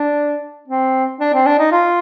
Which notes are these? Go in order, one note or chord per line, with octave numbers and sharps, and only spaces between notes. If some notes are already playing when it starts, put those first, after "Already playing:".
Already playing: D4
C4
D4
C4
D4
D#4
F4